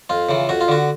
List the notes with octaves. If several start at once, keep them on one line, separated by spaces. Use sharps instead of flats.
F2 F4
C#3 E3
F2 F#4
F4
D3 F#4